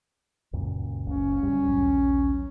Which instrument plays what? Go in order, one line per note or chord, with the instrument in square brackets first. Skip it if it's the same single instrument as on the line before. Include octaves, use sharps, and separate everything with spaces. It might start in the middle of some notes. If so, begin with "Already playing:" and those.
[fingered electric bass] C#2 F#2 A#2
[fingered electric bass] F#1 C#2 [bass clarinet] C#4
[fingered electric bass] D2 G#2 G3
A#1 D#2 F#3